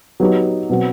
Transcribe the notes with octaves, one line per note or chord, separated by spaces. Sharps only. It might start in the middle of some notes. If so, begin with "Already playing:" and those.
F#3 B3 D#4 G4
B2 F#3 C4 F#4